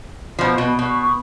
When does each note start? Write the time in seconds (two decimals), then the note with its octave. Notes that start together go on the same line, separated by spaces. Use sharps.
0.39 B2 F3
0.58 B2
0.79 B2 B5 C#6 D#6